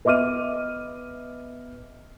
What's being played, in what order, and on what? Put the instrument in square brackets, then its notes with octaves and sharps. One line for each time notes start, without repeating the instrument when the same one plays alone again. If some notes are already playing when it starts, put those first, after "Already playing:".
[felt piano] B3 D#5 E5 D6 F6 D#7